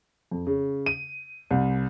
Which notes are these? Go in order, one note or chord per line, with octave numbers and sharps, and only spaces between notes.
F2
C#3
D#7
C2